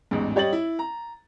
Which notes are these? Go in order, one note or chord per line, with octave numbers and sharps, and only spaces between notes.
A1 E2 G#2
G3 G4 C#5 D#5 A6 F#7
E4
A#5